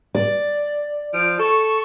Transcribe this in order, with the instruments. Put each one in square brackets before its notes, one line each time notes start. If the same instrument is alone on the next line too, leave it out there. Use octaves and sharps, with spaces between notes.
[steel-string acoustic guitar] D5
[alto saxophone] F3 [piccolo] D7
[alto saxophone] A4 [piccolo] C#6